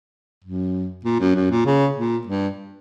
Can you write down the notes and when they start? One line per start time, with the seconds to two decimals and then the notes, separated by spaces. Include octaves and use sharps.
0.44 F#2
1.05 A#2
1.20 F#2
1.35 F#2
1.51 A#2
1.66 C#3
1.96 A#2
2.27 G2